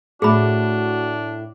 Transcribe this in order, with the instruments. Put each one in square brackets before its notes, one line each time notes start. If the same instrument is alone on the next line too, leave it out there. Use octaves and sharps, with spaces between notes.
[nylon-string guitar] A2 A3 [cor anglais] D4 [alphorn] F#4 [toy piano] G#4 B5